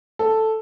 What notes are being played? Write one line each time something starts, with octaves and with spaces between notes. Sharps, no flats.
A4